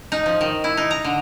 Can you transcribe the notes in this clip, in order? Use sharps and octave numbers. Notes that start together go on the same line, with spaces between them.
D#4
F3
D#3
E4
D#4
A#5
D3